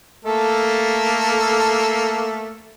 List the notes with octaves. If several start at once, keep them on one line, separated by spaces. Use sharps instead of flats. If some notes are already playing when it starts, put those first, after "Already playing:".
A3 A#3 A4